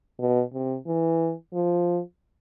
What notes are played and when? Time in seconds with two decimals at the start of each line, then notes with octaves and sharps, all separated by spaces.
0.19 B2
0.53 C3
0.86 E3
1.54 F3